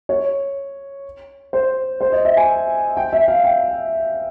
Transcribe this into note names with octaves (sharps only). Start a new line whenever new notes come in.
C#5
C5
C5
D#5
E5
G#5
G5
E5
F5
G5